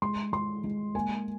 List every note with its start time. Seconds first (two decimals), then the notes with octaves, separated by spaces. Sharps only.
0.02 G#3 C6
0.33 G#3 C6
0.64 G#3
0.95 A#3 G#5